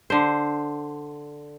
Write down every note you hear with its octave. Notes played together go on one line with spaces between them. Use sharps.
D3 C5